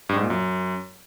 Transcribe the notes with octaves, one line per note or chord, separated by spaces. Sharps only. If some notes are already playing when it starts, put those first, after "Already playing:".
G2
G#2
A#2
F#2